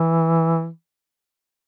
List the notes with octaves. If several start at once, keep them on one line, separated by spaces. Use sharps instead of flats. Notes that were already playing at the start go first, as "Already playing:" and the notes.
Already playing: E3